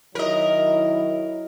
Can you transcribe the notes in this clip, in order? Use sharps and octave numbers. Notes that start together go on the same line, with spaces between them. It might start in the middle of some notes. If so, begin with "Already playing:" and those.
D#3 F#3 E4 A#4 D#5